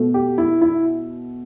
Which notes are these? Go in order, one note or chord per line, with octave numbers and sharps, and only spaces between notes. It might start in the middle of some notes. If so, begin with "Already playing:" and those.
Already playing: B2 A3
G4
E4
E4